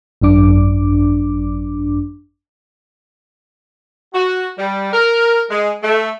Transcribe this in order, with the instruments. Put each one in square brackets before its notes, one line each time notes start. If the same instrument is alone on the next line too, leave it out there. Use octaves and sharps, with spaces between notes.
[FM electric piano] G#1 F#2 D4 D6
[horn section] F#4
G3
A#4
G#3
A3